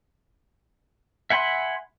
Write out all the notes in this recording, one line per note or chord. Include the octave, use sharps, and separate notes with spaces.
E5 F#5 G#5 B5 C6